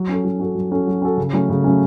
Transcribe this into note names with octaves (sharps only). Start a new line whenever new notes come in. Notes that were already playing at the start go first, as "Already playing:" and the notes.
Already playing: F#3
C#4 F#4 A4
F#3
C#4 F#4 A4
F#3
C#4 F#4 A4
F#3
C#4 F#4 A4
C#3
F#3 A3 C#4
C#3
F#3 A3 C#4